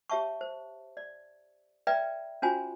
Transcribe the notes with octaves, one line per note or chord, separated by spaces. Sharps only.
G4 C#5 E5 A5 C#6
C5
D5
B4 D5 E5 G5 A#5
C#4 F4 F#4 C5 G#5 A#5